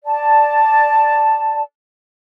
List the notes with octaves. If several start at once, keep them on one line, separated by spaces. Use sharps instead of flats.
D5 A5